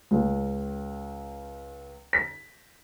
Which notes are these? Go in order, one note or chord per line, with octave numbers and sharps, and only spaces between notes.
C#2
B6